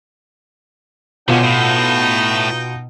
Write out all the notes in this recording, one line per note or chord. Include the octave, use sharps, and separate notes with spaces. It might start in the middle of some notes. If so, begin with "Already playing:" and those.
B2 D3 C#4 D#4 F4 G5 E7
A2